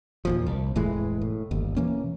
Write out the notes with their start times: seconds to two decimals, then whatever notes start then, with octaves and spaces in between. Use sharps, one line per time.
0.25 D#2 A#2 F3
0.46 C2
0.76 E1 A2 E3 G#3
1.21 A2
1.51 G1 D#2
1.77 B2 E3 A#3 C#4